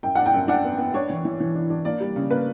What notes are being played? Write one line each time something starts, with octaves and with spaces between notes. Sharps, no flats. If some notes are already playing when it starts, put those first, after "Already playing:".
F#2 G5
D4 F#5
G5
F#2
D4 F#5
B3
B3
D4 C#5
E3
E3
E3
D4
D4
A#3 D5
G3
C#3
A#3 B4